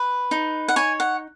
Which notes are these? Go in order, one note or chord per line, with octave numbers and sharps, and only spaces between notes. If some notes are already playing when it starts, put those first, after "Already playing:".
Already playing: B4
D#4
F#5
C#5 G#5
F#5